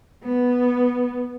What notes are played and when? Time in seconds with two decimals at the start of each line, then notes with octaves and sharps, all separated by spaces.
0.24 B3